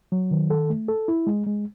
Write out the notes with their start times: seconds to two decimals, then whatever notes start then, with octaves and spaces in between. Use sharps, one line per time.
0.12 F#3
0.31 D#3
0.50 A4
0.70 A3
0.88 A4
1.08 E4
1.27 G#3
1.46 G#3